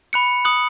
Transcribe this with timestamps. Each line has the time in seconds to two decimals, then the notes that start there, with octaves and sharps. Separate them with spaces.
0.13 B5 F#6 C#7
0.45 D#6 F#6 C#7 F#7